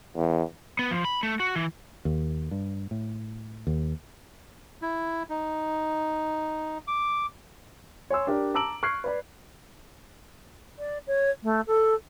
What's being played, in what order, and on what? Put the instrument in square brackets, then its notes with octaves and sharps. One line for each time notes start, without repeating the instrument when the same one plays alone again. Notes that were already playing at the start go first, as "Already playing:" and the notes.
[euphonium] E2
[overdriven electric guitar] B3
F3
B5
A3
F#4
E3
[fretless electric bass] D#2
G2
A2
D#2
[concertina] E4
D#4
D6
[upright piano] C#5 G#5 C6 E6
D4 G4 A#4 D5
A5 A#5 D6 E6 D7 F#7
C#6 F6 F#6 G#6 C7
B4 D5 B5
[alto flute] D5
C#5
A3
A4